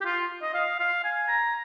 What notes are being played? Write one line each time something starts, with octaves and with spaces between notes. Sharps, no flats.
G4
F4
D#5
F5
F5
G#5
A#5